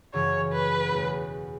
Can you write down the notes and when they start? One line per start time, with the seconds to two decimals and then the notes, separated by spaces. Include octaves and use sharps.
0.14 F#2 C#3 E3 C#5
0.52 B4
0.91 E2 B2 F#3 A3